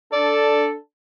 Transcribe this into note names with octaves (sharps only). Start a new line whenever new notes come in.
D4 A4 D5